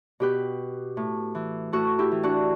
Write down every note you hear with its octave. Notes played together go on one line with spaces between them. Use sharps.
B2 G4 B4
A2
E3
A2 F#4 A4
E4 G4
E3
D4 F#4